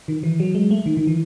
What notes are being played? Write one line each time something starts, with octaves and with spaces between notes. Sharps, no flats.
D#3
E3
F#3
G#3
A3
D#3
D#3
E3